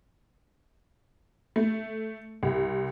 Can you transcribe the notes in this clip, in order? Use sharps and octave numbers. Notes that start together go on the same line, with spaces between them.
A3
C2